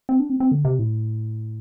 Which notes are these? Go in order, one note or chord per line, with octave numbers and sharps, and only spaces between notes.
C4
D4
C4
C4
D3
C3
A2